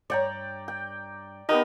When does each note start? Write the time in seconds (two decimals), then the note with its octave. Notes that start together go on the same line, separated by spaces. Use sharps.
0.10 G2 C#5 D5 G5 A#5
0.68 G5
1.49 B3 D#4 G4 A#4